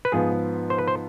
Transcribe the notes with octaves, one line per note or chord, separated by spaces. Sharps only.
B4
G#2 F3 B3 G#4
C5
B4
C5